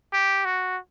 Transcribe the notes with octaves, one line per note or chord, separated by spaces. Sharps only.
G4
F#4